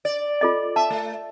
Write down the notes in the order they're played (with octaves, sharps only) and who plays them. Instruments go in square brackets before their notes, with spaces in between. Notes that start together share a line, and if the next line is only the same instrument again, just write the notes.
[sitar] D5
[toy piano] F4 A4 D#5
[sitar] E5 [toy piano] A5
[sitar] A3